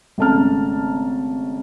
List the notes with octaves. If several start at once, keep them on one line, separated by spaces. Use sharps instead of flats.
G#1 C#3 A3 A5 A#5 F6